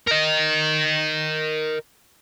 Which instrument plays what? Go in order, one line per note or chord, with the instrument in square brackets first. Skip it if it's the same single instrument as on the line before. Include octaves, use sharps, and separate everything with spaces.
[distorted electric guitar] A#4 D#5